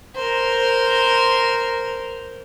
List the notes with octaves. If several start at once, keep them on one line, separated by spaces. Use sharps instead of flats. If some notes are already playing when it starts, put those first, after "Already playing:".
A#4 C5